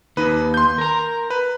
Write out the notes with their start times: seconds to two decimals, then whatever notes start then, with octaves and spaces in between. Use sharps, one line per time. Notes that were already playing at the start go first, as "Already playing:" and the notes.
0.17 D#2 D#4 B4
0.54 C6 G6
0.78 A#4 A#5
1.30 B4